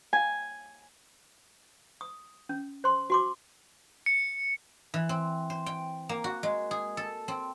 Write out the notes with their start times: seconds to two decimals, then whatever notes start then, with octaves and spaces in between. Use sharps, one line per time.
0.13 G#5
2.01 D#6
2.49 C#4
2.84 C5 C6
3.10 F#4 C6 D6
4.06 C#7
4.94 E3
5.09 C4
5.50 C5
5.66 G5
6.09 A#3
6.24 F#4
6.43 G#3
6.71 G#4
6.97 A4
7.28 C4